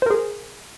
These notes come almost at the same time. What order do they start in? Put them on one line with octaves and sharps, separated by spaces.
C5 A#4 G#4